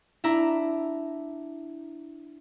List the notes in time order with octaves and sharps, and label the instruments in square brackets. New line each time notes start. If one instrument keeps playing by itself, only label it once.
[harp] D4 E4 A#5